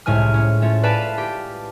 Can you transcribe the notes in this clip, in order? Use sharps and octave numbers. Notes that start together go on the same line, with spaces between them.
C2 A2 G#3 G#5 F6
C#4
A3 C#4 F4
B4 D5 F5 G#5 A5 B5
G4